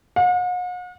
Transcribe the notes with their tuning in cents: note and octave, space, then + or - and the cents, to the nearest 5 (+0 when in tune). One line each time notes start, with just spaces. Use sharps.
F#5 -45